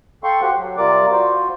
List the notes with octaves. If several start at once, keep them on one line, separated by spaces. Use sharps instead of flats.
A4 F5 G5 C6 C#6
F#4 G4 C5 F#5
F#3
C3 G3 F4 A#4 D5 D6
F4 F#4 C5